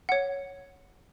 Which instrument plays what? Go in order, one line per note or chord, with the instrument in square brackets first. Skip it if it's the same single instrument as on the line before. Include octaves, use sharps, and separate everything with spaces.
[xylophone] C#5 F#5